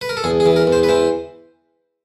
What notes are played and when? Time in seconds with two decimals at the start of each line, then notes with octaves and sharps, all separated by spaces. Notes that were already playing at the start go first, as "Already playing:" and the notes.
0.01 B4
0.09 A#4
0.17 A4
0.24 E2 G#4
0.40 G#4
0.46 E3
0.56 A#4
0.67 E2
0.72 C5
0.83 B4
0.89 E3 C5